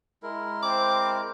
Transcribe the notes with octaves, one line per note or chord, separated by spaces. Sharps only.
G#3 E4 A#4
C4 D6